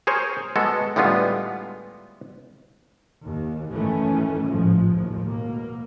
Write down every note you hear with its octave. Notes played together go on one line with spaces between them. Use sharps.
G#4 A#4 C5 C#5
G#3 B3 F#4 A4
A2 D3 G3 G#3 B3 F4
D#2
F#1 G#2 D#3 E3 A3 C#4
A1 G#2 F3 G#3
A1 D#2 F3
B2 A#3